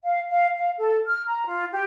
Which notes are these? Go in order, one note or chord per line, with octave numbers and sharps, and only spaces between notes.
F5
F5
F5
A4
F6
A#5
F4
G4